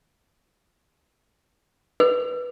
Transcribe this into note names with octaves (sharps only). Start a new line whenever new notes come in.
B4